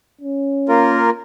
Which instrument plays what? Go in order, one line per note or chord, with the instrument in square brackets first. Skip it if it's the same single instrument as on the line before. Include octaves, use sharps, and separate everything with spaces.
[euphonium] C#4
[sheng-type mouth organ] A#3 F4 A#4